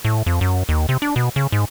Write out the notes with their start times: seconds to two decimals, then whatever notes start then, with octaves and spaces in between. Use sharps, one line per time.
0.05 A2
0.26 F2
0.41 F#2
0.69 D#2
0.89 C3
1.02 D4
1.16 B2
1.36 C#3
1.52 G#2